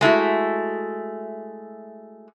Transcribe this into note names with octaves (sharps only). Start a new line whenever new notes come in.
G#3 A3 E4 F#4